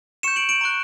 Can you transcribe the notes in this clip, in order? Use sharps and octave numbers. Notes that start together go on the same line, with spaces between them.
C#6 G6 C#7 E7
D7 F#7
D7 F#7
A#5 C#6 F#6